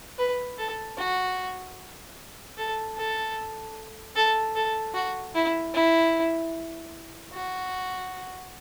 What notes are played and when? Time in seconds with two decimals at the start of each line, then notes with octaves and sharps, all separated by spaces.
0.18 B4
0.58 A4
0.98 F#4
2.57 A4
2.97 A4
4.16 A4
4.56 A4
4.94 F#4
5.35 E4
5.74 E4
7.33 F#4